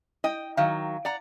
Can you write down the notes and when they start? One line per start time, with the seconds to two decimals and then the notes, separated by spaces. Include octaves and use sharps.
0.24 E4 D#5 G5
0.57 D#3 F#3 F5
1.05 D5 F#5 A#5